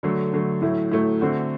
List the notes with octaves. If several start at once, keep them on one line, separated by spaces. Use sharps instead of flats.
D3 F#3 A3
D3 F#3 A3
A2 F#3 A3 E4
A2 F#3 A3 E4
D3 A3 C4 F#4